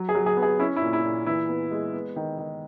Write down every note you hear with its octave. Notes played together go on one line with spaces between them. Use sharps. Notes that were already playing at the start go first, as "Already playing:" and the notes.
Already playing: F#3
G#4
F#3
G#4
B3
G#4
C#4 E4
E4
A#2
E4
A#2
E3 E4
B3
G#3
B3
D#3
D#3